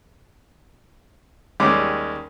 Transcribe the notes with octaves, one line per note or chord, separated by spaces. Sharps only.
D#2 G3 G#3 C#4 D6